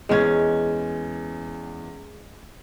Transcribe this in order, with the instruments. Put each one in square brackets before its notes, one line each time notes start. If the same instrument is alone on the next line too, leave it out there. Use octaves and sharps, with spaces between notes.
[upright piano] E2 G#6 [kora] G#3 C#4